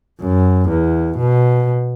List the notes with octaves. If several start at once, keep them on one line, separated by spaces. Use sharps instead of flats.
F#2
E2
B2